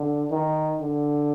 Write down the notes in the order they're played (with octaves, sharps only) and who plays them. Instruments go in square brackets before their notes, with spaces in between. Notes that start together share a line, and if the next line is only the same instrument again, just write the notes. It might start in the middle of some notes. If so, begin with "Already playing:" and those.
Already playing: [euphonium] D3
D#3
D3